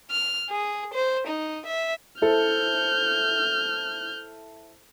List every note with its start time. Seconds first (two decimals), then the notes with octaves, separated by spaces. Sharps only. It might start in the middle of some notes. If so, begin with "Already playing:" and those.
0.10 F6
0.50 G#4
0.94 C5
1.27 D#4
1.66 E5
2.22 E4 A4 C5 F6 G6